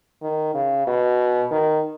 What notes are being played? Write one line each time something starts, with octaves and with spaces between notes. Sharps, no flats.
D#3
C#3
B2
D#3